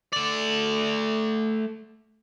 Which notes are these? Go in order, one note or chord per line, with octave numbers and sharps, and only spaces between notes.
A3 D5